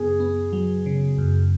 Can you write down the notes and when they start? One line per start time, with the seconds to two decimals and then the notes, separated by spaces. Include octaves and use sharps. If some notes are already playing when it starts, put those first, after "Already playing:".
Already playing: F#2 C#3 B3 G#4
0.20 B3
0.53 F#3
0.86 C#3
1.18 F#2